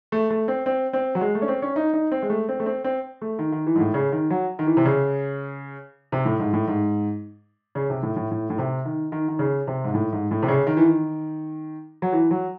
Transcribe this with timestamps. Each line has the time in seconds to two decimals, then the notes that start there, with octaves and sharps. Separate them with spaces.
0.12 A3
0.30 A3
0.48 C4
0.66 C4
0.93 C4
1.15 F#3
1.21 G#3
1.35 A3
1.42 C#4
1.48 C4
1.62 C#4
1.76 D#4
1.94 D#4
2.12 C4
2.22 G#3
2.30 A3
2.49 C4
2.60 A3
2.66 C4
2.84 C4
3.21 A3
3.39 D#3
3.52 D#3
3.66 E3
3.75 G#2
3.80 A2
3.94 C#3
4.12 D#3
4.30 F#3
4.59 D#3
4.67 E3
4.77 C3
4.85 C#3
6.12 C3
6.25 A2
6.39 G#2
6.53 A2
6.67 G#2
7.75 C#3
7.90 C3
8.03 A2
8.16 A2
8.31 A2
8.50 A2
8.58 C3
8.85 D#3
9.12 D#3
9.28 D#3
9.39 C#3
9.67 C3
9.84 G#2
9.94 A2
10.12 G#2
10.31 A2
10.42 C3
10.48 C#3
10.67 D#3
10.77 E3
10.85 D#3
12.02 F#3
12.12 E3
12.31 F#3